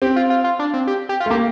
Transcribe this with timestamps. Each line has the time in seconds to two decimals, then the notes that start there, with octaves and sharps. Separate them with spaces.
0.02 C4 G4
0.16 F4
0.30 F4
0.44 F4
0.59 D4
0.74 C4
0.87 G4
1.09 G4
1.20 F4
1.26 A3
1.30 A#3 G4